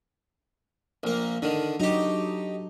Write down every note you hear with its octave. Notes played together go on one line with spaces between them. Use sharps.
A#1 A#3
D3 D#3 D4 A4
F#3 D4 D#4 F#4 G4